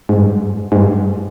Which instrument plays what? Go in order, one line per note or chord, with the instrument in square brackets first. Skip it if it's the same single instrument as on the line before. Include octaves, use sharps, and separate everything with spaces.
[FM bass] G#2
G2
G#2
G2